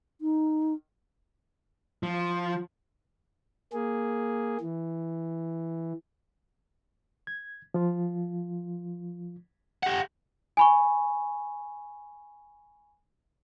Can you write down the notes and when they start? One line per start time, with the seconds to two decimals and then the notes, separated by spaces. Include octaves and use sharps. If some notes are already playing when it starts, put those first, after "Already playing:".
0.21 D#4
2.03 F3
3.73 A#3 G#4
4.61 E3
7.27 G#6
7.74 F3 F4
9.83 G4 F#5
10.57 G#5 B5 C#6